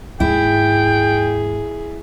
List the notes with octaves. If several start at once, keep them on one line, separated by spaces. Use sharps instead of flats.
D#2 G#2 E4 G#4 G5